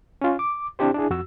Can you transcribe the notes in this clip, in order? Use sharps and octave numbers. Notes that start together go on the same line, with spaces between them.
C#4 F4
D6
C4 D4 E4 G4 C5
D4 E4 G#4
F2 F#4 E6